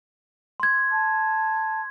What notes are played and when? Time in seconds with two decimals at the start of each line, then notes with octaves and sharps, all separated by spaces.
0.60 C6 G#6
0.91 A5